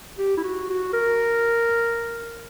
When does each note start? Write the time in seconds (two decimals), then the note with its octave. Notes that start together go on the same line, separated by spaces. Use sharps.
0.18 G4
0.37 E4
0.44 F#4
0.69 F#4
0.93 A#4